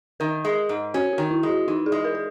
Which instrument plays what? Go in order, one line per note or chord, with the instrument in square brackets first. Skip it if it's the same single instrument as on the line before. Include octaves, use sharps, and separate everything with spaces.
[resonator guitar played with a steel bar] D#3 [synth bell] A#4
[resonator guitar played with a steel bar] G#3
G#2
[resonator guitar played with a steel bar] C#4 [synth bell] F#4
[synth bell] F#4
[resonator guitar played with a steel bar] D#3
[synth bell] E4
[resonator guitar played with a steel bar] G#3
[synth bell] F#4
[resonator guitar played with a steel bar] E3 [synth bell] D#4
[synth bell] G#4
[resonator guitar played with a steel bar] G#3
[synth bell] A#4
A#4